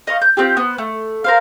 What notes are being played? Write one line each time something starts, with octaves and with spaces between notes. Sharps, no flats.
D#5 F5 C#6
G6
C4 F4 G4
B3 C5
A3
A#4 C5 F5